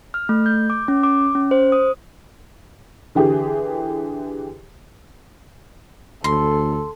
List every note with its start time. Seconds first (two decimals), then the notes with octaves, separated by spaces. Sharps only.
0.14 F6
0.29 A3
0.46 G6
0.70 D6
0.88 C#4
1.03 D6
1.35 C#4
1.51 C5
1.72 D#6
3.15 D3 E3 G4 G#4
6.24 D2 A4 C6